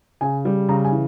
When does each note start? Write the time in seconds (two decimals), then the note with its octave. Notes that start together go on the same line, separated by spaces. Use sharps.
0.21 C#3 G#5
0.45 G3
0.69 C#3 A#5
0.84 G#5
0.92 E3